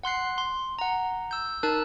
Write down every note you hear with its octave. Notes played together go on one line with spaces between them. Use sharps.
F#5 C6 F#6 C7
C6
F#5 A#5
E6 G6
D#4 A#4 A5 E6 F#6